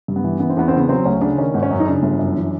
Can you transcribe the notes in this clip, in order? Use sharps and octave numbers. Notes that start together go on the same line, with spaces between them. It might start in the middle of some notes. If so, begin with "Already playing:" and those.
G2
B3
E3
E3 B3
C4
E2 B3
C4
C#3 B3
F#3 C4
D2 C#4
C#3 D4
D#3 C#4
G#1
C#4
F#2
D#4
C#3 D4
G1
F#2
E3